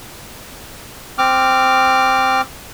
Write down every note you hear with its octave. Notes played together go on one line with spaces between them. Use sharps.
C4 D6 F6